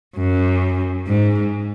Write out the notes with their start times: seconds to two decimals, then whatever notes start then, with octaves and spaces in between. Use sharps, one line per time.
0.17 F#2
1.07 G#2